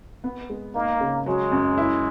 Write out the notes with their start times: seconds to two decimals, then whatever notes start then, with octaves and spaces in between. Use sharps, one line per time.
0.24 B3
0.50 G#3
0.75 A#3 D#4
1.01 C#3
1.26 F#3 G#3
1.52 F#2
1.78 E4